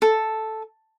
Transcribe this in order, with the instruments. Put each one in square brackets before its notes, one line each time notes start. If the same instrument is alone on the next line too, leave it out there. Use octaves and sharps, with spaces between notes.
[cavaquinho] A4